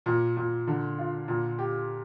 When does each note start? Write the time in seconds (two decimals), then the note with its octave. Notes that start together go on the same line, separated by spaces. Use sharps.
0.06 A#2
0.36 A#2
0.67 D3
0.98 F4
1.28 A#2
1.59 G4